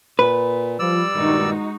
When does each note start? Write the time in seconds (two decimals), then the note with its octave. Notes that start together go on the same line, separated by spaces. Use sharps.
0.19 A#2 B4
0.79 F3 G3 D5 E6
1.14 G2 A#2 D#3 G#3 D#4 F#4